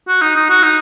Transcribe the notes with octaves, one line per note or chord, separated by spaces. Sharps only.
F#4
D#4
D#4
F#4
D#4